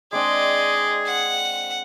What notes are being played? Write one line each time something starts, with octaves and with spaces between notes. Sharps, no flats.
G#3 C4 D4 G#4 D5 D#5
F#5